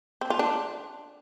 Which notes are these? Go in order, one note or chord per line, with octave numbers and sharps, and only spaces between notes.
C4
F4
D4